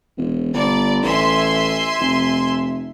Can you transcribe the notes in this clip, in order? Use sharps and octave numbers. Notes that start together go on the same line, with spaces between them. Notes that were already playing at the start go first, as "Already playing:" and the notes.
E1
G1 D5
A1 E5 G#5 C6
F1